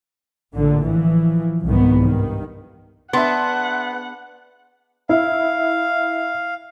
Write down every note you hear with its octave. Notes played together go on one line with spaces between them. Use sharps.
A1 A#2 D3
E3 F3
C2 G#2 D#3 B3
G2 D#3
B3 D4 G#4 E5 F#5 C6
E4 F5